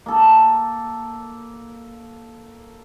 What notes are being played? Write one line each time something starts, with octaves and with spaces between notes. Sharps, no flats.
A#3 A4